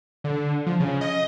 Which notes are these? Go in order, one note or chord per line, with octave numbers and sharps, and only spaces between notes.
D3
F3
C#3
D#5